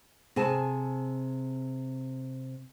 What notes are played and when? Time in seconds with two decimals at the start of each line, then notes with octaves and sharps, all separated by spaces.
0.36 C3 G#4 G#5 A5